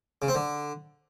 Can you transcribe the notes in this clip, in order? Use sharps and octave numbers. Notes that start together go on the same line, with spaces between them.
C#3
C4
D3